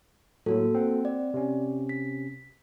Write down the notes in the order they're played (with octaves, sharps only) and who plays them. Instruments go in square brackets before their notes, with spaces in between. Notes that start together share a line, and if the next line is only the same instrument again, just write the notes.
[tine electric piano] A2 F#3 [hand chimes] A#3 F#4 A4
[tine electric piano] C4 F#5
[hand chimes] D5
[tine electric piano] C3 C#4
[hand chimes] B6